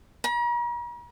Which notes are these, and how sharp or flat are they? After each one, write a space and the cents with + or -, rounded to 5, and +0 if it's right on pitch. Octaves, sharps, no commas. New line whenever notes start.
A#5 +45